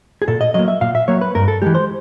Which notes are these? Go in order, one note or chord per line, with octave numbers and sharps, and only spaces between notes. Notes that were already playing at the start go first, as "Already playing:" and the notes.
G#4
A#2 A4
D#5
F#3 A#3 D#5
E5
A#2 F5
E5
F#3 A#3 C#5
B4
G2 A#4
A4
E3 G#3 G4
C5